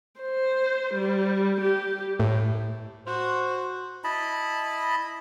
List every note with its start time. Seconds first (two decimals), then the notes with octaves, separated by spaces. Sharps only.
0.21 C5
0.94 G3
1.61 G4
2.20 A2
3.06 F#4 C5
4.04 E4 D#5 A5 B5